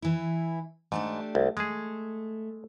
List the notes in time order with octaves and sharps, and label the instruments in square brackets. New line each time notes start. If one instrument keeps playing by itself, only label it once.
[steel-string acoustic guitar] E3 E4
[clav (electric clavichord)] G#2 [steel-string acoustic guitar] A3 D4 G4
[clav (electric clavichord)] C2
[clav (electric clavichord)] G#3 G#4 [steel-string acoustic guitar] A3